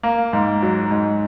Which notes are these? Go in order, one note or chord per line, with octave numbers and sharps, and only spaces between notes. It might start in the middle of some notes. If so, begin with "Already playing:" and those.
A#3
G#2
F#3
G#2